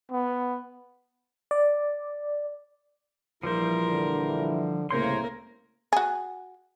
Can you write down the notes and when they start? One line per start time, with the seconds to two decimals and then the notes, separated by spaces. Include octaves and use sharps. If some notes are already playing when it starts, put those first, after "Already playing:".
0.11 B3
1.51 D5
3.43 A#1 E3 F3 G3 E4 A#4 C5
3.90 D3
4.91 C2 A2 C#3 A#3 A#4 C5 C#5 C6
5.93 F#4 G#4